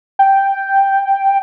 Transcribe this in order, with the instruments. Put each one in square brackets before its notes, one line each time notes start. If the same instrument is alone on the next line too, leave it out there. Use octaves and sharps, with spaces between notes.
[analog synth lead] G5